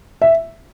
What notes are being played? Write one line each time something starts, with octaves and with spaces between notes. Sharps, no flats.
E5